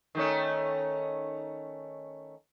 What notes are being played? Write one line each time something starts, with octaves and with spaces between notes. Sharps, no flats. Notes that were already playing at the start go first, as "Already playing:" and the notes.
D#3 A3 C#4